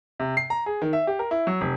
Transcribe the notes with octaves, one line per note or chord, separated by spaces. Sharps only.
C3
C7
A#5
G#4
D#3
E5
G4
A#4
E4
F#3
F1